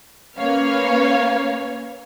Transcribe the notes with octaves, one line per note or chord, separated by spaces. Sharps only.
A#3 C#4 B4 C#5 F5